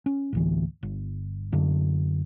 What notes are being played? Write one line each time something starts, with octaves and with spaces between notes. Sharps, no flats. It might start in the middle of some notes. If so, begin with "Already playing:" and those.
C#4
A1 D2 E3
G1
F#2 D3